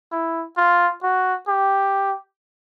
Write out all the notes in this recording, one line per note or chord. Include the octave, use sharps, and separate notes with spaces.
E4
F4
F#4
G4